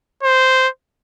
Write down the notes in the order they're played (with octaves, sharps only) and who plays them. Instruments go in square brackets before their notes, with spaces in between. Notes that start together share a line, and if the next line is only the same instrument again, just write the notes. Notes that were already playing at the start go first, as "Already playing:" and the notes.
[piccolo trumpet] C5